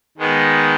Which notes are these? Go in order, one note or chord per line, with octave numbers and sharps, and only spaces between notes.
D#3 G#3 B3 D#4